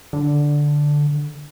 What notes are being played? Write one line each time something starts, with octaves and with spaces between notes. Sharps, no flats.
D3